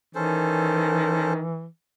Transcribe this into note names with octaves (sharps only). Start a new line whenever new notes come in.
D#3 E3 C#4 A4 C5